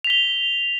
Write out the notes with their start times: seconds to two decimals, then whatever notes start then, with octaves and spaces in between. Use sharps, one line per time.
0.04 F7
0.07 B6
0.10 G7